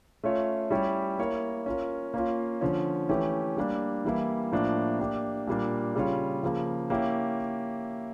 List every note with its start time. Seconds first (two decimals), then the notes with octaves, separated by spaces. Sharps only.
0.24 A3 C#4 F4 C#5 E5
0.71 G3 C#4 E4 G4 C#5
1.19 A#3 E4 A#4 C#5
1.66 C#4 F4 A#4
2.14 A#3 C#4 F4
2.61 D3 F3 C#4
3.09 E3 A3 C#4 G4
3.57 G3 A#3 D4
4.05 E3 G3 A#3 E4
4.52 A2 F3 A#3 D4
4.99 A#3 D4 G4
5.47 A#2 G3 A#3 D4
5.95 C#3 G3 C#4 F4 C#5
6.43 C#3 F3 A#3
6.90 A#3 C#4 E4 G4